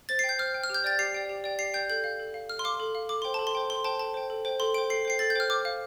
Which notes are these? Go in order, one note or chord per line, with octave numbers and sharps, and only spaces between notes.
C5 A6
C7
G5
G6
C5 F6
G5
F6
G4 G6
D5 G5 A6
G4 C7
D5 G5
G4
D5 G5
G4 C7
D5 G5 G6
A4 G6
F5
A4
F5
A4 F6
C6
F5 D6
A4
F5
A4 D6
C5 G5 C6
A4 A5
C6
C5 G5
A4 C6
C5 G5 A5
A4 A5
C5 G5
A4
C5 G5
A4 C6
C5 G5 D7
A4 C7
C5 G5 C7
A4 A6
G6
C5 G5 F6
C5 D6
F5